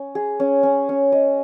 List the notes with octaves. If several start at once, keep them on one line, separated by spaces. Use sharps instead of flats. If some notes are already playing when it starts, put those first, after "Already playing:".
Already playing: C#4
G#4
C#4
C#4
C#4
D#5